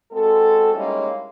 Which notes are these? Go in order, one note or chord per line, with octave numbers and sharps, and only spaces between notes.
G#3 C4 F#4 A4
G3 G#3 A#3 C#4 D#4 E4